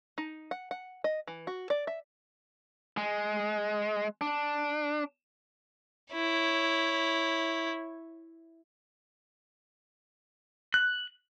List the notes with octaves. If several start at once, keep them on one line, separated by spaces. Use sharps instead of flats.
D#4
F#5
F#5
D#5
E3
F#4
D5
E5
G#3
D4
E4 C#5
F#6